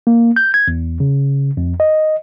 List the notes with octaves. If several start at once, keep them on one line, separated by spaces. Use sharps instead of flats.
A#3
G6
G#6
E2
C#3
F2
D#5